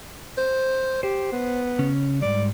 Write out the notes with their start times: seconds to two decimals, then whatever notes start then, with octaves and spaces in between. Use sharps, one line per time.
0.38 C5
1.03 G4 C5
1.32 B3
1.79 C#3 C#4
2.22 G#2 G3 D5